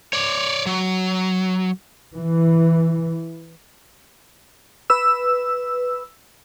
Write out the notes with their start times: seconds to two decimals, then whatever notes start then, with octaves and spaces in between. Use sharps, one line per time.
0.13 C#5 D5
0.66 F#3
2.15 E3
4.90 B4 E6